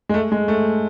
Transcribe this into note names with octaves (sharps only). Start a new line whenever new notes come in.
G#3
A3
G#3
A3